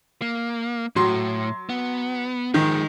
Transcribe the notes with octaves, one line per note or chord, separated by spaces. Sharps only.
A#3
A2 F#3 C6
B3
D#3 F3 G#3